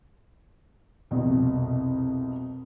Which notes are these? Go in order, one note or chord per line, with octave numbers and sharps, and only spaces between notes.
C2 F2 B2